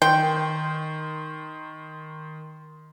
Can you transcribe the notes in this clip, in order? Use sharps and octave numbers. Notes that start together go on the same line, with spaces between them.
D#3 G5 C6